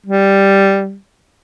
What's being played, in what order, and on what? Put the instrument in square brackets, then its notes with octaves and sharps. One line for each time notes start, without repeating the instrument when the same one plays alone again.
[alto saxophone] G3